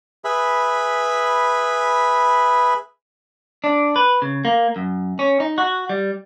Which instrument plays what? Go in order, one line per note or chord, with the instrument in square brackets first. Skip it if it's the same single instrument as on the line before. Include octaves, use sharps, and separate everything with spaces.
[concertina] G#4 B4 E5 B5
[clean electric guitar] D4
B4
C#3
A#3
F#2
C#4
D#4
F#4
G3